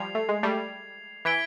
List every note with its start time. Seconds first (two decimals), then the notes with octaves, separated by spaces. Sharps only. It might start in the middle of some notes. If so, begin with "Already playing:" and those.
Already playing: F3 G3 G#6 C7 F7
0.15 A3
0.29 G#3
0.43 G3 A3
1.25 E3 G#6 B6 D7 G7